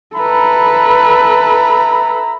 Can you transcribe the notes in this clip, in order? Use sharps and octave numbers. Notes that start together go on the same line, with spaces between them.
E4 A4 B4 A#5 B5